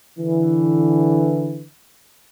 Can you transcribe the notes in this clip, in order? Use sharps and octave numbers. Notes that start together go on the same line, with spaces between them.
D3 E3